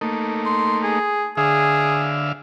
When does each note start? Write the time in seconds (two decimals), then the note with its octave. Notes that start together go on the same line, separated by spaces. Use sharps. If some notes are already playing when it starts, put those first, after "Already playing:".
0.01 A3 A#3 D#4
0.46 C6
0.84 G#4
1.37 D3 G#4 E5 F5